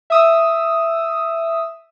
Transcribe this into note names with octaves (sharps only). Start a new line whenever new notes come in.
E5 D#6 E6